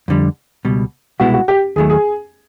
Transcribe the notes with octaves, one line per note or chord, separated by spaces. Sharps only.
F2 D3 G3
C#2 B2 G3
C2 B2 G#3 B3 E4 F#4
F#4
G4
D#2 D#3 F#3 A3 G#4
G#4